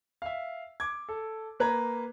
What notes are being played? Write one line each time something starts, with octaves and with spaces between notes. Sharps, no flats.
E5 F5
D6 G#6
A4
A#3 B4 A#5 G#6